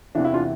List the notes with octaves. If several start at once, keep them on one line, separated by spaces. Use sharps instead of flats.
E2 C3 E3 D4
E4
D4 F4